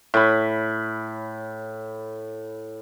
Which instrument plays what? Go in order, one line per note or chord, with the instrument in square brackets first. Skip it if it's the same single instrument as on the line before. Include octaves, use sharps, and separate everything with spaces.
[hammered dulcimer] A2 B5